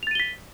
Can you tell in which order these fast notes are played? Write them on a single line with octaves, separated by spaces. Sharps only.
F7 A6 D#7 G7 B6